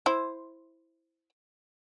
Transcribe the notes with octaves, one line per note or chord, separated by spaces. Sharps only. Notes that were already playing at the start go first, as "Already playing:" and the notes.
E4 C5